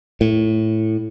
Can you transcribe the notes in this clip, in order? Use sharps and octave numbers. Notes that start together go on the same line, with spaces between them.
A2